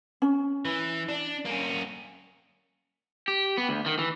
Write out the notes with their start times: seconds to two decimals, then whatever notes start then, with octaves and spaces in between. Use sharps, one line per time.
0.22 C#4
0.65 E3
1.09 D4
1.46 A#3 C#4
3.28 G4
3.58 B3
3.69 D2
3.86 D#3
3.99 E3